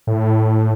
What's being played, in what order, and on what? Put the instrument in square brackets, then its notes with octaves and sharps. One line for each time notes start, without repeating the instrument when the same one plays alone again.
[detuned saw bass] A2